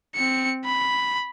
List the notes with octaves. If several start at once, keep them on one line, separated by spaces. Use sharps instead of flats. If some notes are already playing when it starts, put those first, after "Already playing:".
C4 C#7
B5